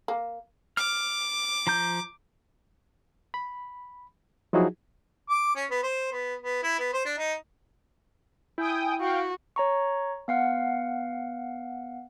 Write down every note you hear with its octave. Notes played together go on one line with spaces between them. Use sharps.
A#3
D6 F6
F3 A#5 G6
B5
F3 F#3 D#4 E4 F#4 G#4
D6
C#4
B3
C5
B3
B3
E4
B3
C5
D4
D#4
E4 G5 G#5 D#6
F#4 F5 G5
C#5 A#5 C#6
B3 F5 F#5